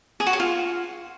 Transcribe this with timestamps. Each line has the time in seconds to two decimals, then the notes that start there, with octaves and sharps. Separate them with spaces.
0.20 G#4
0.27 F#4
0.33 C#5
0.40 F4